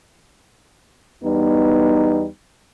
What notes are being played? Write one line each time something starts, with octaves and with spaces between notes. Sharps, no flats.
E2 G3 B3 D#4